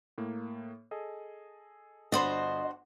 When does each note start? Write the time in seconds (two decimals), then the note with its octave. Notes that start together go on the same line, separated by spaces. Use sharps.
0.18 A2 A#3
0.91 G#4 A4 D#5
2.12 G1 D4 F#4 C5 D#5 B5